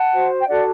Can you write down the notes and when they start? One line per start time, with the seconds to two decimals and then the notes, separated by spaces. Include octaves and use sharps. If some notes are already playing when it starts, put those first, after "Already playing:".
Already playing: F#5 A5
0.13 F#4 C5
0.39 G5
0.48 D4 F#4 A4 D5 F#5